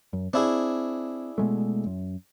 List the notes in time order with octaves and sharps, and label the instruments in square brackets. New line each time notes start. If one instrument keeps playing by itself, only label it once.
[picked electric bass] F#2
[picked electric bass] C4 [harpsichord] D4 E4 G#4
[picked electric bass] B2 G#3 A3
F#2